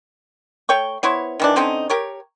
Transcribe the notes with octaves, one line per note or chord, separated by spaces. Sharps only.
A3 C#5 G5 C#6
B3 E4 C5 C#5
D#3 E3 D4
D3 C4 C#4 D#4
G4 A#4 C#5